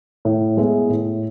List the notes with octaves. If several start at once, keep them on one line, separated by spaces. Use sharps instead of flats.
A2
G#3 B3 E4 G#4
A2